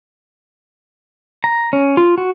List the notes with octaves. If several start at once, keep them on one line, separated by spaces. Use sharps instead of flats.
A#5
C#4
F4
F#4